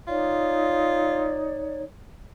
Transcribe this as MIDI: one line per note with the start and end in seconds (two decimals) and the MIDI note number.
0.08 1.82 63
0.08 1.47 65
0.08 1.82 73
0.08 1.82 74